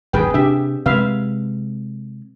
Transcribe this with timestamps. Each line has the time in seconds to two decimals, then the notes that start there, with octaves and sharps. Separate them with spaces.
0.13 F#1 D#2 G#2 G#4 B4 G5
0.34 C3 D4 G4 E5
0.86 C3 G#3 B4 E5 F5